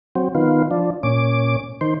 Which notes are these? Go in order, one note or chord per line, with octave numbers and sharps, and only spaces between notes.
F#3 C4
D#3 B3 F4
F3 D4
A#2 C#4 D6
D#3 C5